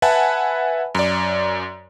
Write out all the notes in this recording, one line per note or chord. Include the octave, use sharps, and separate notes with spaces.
B4 E5 F#5 G#5 A5 B5
F#2 D5